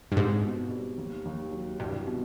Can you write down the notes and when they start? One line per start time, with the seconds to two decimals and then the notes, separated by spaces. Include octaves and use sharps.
0.12 G2
0.16 G#2 C4
0.44 B2
0.70 G3
0.98 D#2
1.25 D#2
1.52 F#3
1.80 C2 G2
2.07 B2